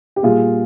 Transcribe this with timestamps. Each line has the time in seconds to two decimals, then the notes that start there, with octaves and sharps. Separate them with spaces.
0.16 G4
0.23 A#2 G3 F4 G#4